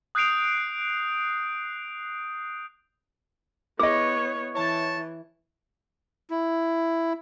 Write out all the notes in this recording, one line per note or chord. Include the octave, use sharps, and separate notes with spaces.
D#6 F#6 G6 C7 D7 F7
B3 E4 G#4 C#5 D#5
E3 C#5 A5
E4